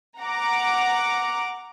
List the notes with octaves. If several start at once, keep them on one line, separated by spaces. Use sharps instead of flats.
F#5 A#5 D6